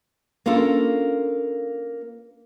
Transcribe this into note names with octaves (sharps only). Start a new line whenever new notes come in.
A#3 C#4 D4 F4 A4 A#4